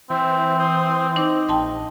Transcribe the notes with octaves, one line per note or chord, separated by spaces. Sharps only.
E3 C4 C5 E5
C5 C6 D#6
D#4 C5 D#5 D6
A#1 G5 A5 C6